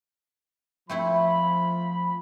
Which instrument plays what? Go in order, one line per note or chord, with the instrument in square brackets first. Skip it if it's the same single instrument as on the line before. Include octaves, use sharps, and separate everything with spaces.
[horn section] F3 B5 [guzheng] A3 C4 E4